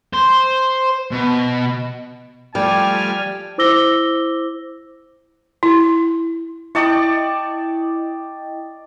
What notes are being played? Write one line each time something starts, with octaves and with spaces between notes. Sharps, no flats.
C5
B2
F3 G3 A3 D5 G5 G#5 F6
E4 C5 D6 E6 A#6 G7
E4
E4 D5 D#5 G5 A5 C#6